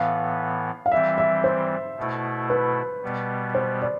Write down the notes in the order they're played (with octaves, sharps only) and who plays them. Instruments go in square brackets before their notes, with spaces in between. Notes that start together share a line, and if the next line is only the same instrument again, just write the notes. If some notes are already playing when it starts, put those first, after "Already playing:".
Already playing: [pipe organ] A2 E3 B3 [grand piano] F5
[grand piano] F5
[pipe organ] E3 G3 C4 [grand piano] E5
[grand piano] E5
C5
[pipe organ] B2 A3 E4
[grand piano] B4
[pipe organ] B2 G3 B3
[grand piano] C5
D5